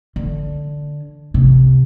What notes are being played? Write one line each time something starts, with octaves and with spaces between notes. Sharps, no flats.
D3
C3